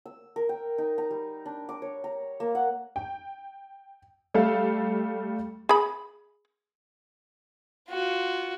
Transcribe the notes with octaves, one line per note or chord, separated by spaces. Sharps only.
E6
A#4
G5
D#4
A#5
G3
D4
D6
C#5
A#5
A#3
F#5
G5
G3 A3 A4 E5 F5
G#4 B5
F4 F#4